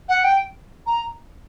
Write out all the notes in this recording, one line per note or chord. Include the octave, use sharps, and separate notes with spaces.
F#5
G5
A#5